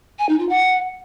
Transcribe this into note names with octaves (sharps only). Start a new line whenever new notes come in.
G#5
D#4
F4
F#5